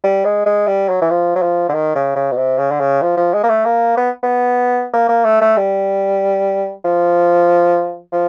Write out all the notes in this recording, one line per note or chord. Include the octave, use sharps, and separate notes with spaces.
G3
G#3
G#3
G3
F#3
E3
F3
F#3
F3
D3
D#3
C#3
C#3
B2
C3
C#3
D3
C#3
F3
F3
G#3
A#3
A3
A#3
B3
B3
A#3
A#3
A3
A3
G3
F3
F3